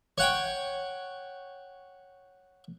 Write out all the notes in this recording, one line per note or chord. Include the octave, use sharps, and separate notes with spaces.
C#5 F#5 G5